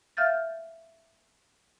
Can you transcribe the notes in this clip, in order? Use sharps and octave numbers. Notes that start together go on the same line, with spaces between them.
E5 F5 F6 G6 A6